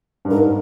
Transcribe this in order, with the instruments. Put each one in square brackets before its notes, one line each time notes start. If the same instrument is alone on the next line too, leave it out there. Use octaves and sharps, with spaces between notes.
[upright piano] G2
[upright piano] G#2 [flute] A#4